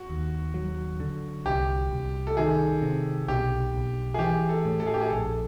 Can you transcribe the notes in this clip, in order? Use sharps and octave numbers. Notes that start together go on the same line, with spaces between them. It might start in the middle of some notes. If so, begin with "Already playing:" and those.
Already playing: F#4
D#2
F#3
D3
C2 G4
C2
A4
D#3 G#4
C3
B1 G4
B1
G#4
E3 G4
A4
A2
A4
G#4
G4
G#4
A#1 A4